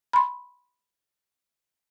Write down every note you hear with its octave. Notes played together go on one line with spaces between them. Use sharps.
B5 C6